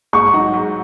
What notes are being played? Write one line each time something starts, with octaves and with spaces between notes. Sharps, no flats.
G#2 C#6
F#3 D#4 F#4
G#2